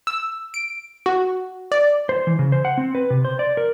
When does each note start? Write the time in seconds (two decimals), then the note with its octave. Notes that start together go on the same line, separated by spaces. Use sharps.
0.07 E6
0.54 D7
1.06 F#4
1.72 D5
2.09 C5
2.27 E3
2.39 C#3
2.52 C5
2.65 F#5
2.77 C4
2.95 B4
3.10 C3
3.25 C5
3.39 D5
3.57 A#4